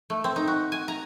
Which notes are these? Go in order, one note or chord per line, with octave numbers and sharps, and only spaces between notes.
A3
C4
D#4
F#4
G#5
A#5